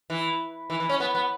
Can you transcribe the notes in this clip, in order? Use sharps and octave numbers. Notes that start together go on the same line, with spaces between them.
E3
E3
E3
C#4
B3
B3